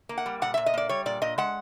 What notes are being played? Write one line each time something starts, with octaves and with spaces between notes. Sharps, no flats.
A#3
F#5
G3
A#2 F#5
E5
A#2
D#5
A#3 D5
G3 C#5
A#2 D5
A#2 D#5
G#3 F#5